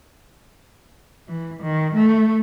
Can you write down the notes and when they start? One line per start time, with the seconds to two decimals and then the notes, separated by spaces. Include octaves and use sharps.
1.28 E3
1.63 D#3
1.95 A3